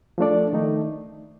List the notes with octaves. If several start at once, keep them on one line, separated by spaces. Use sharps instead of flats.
F3 A3 D4 A4 D5
D#3 A3 D#4